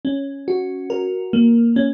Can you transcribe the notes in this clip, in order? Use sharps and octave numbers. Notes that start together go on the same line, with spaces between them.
C#4
F#4
A#4
A#3
C#4